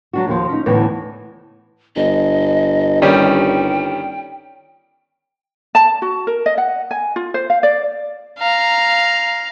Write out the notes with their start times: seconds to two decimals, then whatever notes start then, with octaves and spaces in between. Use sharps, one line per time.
0.13 F#3 D4 F#4
0.28 D#2 E3 F3
0.49 C#4 D#4
0.66 D2 A2 E3 B3
1.96 G1 D#5
3.02 D#3 G3 C#4 G5
5.75 A5
6.02 F#4
6.27 A#4
6.46 D#5
6.58 F#5
6.91 G#5
7.16 F4
7.34 C5
7.50 F5
7.63 D5
8.39 F5 A#5